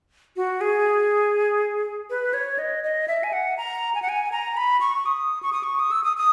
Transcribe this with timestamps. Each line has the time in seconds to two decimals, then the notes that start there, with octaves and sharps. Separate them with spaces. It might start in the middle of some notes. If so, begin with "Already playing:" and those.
0.36 F#4
0.61 G#4
2.10 B4
2.34 C#5
2.58 D#5
2.84 D#5
3.08 E5
3.24 G#5
3.33 F#5
3.58 A#5
3.95 G#5
4.02 F#5
4.09 G#5
4.32 A#5
4.57 B5
4.80 C#6
5.06 D#6
5.43 C#6
5.53 D#6
5.63 C#6
5.79 D#6
5.91 E6
6.04 D#6
6.17 D#6